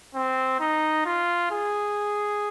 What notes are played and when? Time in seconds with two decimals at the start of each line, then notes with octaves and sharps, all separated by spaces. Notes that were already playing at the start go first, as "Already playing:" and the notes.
0.15 C4
0.60 D#4
1.06 F4
1.51 G#4